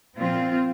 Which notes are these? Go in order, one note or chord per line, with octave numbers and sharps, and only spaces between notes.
A#2 F3 C4 F4